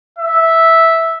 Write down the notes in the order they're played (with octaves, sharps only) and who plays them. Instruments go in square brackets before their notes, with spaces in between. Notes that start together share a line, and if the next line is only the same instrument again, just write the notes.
[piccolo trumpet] E5